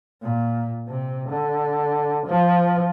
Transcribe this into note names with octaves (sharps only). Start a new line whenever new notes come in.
A#2
C3
D3
F3